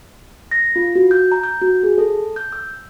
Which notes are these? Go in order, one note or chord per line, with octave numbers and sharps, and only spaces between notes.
A#6
F4
F#4
G6
A#5
G6
F#4
G#4
A4
G6
E6